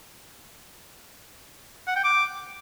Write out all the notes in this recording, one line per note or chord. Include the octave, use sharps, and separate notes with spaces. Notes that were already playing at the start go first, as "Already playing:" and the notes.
F#5
G5
D6